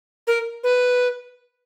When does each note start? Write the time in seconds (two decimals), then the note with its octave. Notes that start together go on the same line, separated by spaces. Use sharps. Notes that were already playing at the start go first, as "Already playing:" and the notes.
0.27 A#4
0.64 B4